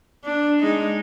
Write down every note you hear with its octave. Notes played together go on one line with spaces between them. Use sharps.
D4
G#3 D#4